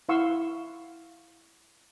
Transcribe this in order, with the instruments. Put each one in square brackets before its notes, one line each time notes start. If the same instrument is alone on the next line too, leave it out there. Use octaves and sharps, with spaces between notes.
[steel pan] E4 F5 F#5 C6 C#6 E6